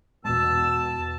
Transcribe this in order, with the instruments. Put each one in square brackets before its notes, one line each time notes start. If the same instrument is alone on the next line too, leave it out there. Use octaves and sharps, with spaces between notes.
[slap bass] E2 G#3 [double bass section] B2 [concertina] A5 [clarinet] E6